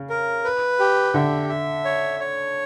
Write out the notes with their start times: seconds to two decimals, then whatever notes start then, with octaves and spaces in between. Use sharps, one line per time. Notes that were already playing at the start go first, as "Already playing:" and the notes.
Already playing: C#3
0.10 A#4
0.45 B4
0.80 G4
1.14 D3 E5
1.49 E5
1.85 C#5
2.20 C#5